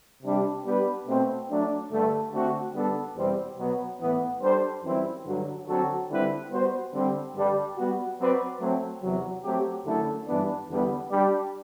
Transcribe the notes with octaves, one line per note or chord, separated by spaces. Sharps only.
C3 G3 D4 G4
G3 B3 D4 G4 B4
B2 A3 C4
F#3 A3 D4
G2 D3 A3
D3 A3 C4 F#4
D3 G3 B3 D4 A4
E2 B2 G3 C4
B2 F#3 B3
A2 E3 B3
G3 D4 A4 C5
F#2 E3 G3 C4 E4
G2 D3 F#3
D3 F#3 C4 F#4 A4
D3 G3 C4 E4 B4
G3 B3 F#4 C5
D3 G3 C4
G2 D3 G3 D4
G3 B3 F#4
F#3 C4 F#4 B4 D5
F#3 A3 C4
E2 C3 F#3
F#3 A3 C4 G4
F#2 D3 A3 E4 A4
G2 E3 B3 D4
E2 D3 G3 B3
G3 D4 G4 D5